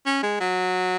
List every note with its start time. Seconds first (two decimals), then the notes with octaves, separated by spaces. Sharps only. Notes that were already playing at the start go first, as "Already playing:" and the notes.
0.06 C#4
0.23 G#3
0.40 F#3